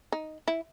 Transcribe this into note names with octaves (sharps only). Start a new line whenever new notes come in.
D#4
E4